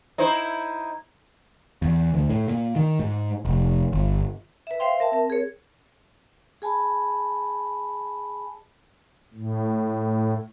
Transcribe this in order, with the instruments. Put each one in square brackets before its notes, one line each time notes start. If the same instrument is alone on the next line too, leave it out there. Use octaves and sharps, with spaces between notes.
[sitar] D#4 E4 C5
[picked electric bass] E2
D2
A2
A#2
D#3
G#2
F1
G1
[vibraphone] B4 E5
C5 E5 F5 G5 C6
A#4 E5 A5
C4 A#4
G#4 C#5
G#4 G#5 A5 B5
[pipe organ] A2